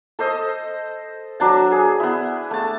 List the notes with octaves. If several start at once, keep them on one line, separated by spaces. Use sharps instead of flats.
A4 C5 D#5
F#3 D4 A5
G#4
B3 E4
A3 A5